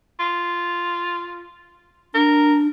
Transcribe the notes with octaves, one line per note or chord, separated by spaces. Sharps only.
F4
D4 A#4